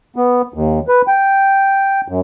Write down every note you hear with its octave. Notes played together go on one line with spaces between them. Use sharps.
B3
D#2
B4
G5
F#2